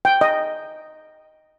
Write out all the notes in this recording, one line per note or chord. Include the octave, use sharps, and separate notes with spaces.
G5
D#5